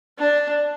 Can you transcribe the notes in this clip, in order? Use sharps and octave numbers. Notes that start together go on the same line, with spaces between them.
D4